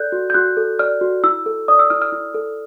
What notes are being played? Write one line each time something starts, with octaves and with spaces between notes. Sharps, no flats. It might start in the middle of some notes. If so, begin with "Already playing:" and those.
Already playing: A4 D5 F#6 G6
F#4
G6
F#4 F#6
A4
D5 F6
F#4
E4 E6
A4
D5 D#6
E6
E4 F6
F6
E4
A4